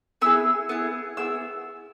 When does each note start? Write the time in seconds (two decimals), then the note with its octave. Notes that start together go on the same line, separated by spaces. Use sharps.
0.22 B3 E4 G#4 E6
0.69 B3 E4 G#4
1.17 B3 E4 G#4 E6